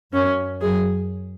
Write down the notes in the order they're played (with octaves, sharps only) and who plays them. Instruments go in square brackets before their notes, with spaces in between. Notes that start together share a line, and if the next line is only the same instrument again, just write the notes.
[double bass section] F#2 [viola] C#4
[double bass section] F#2 [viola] G#4